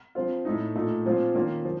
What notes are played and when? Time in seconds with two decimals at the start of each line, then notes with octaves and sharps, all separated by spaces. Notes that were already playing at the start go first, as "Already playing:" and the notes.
0.15 F3 C4 F4
0.45 A2 A3 D#4
0.75 A#2 A3 D#4
1.06 A#2 F3 C4 F4
1.35 D#3 A#3 C#4 F4
1.65 F3